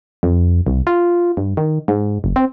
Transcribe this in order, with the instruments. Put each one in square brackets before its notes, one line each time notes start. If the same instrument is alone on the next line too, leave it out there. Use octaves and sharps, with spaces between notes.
[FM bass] F2
C2
F4
G2
D#3
G#2
F#1
C4